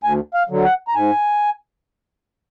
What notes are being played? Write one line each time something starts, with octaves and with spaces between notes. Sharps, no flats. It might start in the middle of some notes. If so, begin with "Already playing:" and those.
D2 G#5
F5
D3 F#3
F#5
A#5
G#2 G#5